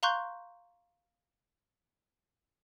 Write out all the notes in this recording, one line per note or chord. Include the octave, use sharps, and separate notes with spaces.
F5 A#5 C6 C#6 F#6 G6